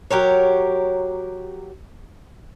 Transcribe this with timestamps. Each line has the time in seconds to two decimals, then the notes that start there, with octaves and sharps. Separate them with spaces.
0.11 F#3 G4 A#4 C#5